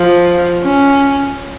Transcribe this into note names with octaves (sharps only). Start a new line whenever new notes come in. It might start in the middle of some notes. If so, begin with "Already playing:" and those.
Already playing: F3
C#4